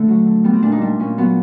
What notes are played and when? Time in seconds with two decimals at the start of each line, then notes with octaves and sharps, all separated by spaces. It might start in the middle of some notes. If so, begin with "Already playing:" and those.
Already playing: D3 A3
0.08 F#3
0.27 D3
0.44 G3 B3
0.53 C4
0.63 A#2 D4
0.72 D#4
0.81 G3 D4
1.00 A#2 C#4
1.18 F#3 B3